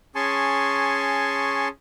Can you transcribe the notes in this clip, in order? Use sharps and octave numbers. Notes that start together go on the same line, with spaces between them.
C#4 G#4 G#5 A5 C6 C#6